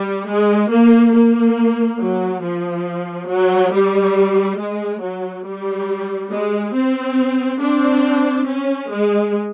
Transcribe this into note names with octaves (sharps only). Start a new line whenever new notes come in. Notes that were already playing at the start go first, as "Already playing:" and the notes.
Already playing: G3
G#3
A#3
A#3
F#3
F3
F#3
G3
G#3
F#3
G3
G#3
C4
C4 D4
C#4
G#3